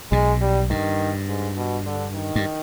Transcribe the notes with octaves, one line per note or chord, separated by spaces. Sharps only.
B1 B2 G#3
G3
G2 D#3
G#2
B2
D3
D#3
G2